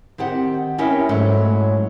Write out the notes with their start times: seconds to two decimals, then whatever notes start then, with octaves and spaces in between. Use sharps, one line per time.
0.18 D#3 C4 G4 F#5
0.78 C#4 D#4 E4 G4 A#4 E5
1.09 G#2 F#3 A3 C#4 E4